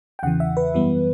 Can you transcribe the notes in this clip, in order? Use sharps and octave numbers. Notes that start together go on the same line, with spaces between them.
G5
E2 C#3 E3 F#5
E5
B4
F#2 E3 G3 B3